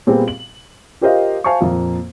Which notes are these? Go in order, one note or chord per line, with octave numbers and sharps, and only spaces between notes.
A#2 G3 B3 C4 G4 G#4
F#7
F4 G4 A#4 C5 D#5 F5
C5 F5 G#5 A5 C#6
F2 A#2 A#3 F4